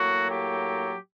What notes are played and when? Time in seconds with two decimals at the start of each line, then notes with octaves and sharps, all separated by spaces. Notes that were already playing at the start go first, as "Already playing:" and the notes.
Already playing: A2 F#3 A#3 F#4
0.29 G4